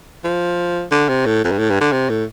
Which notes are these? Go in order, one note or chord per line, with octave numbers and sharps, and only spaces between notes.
F3
D3
C3
A2
F2
G2
A2
G2
D3
C3
A2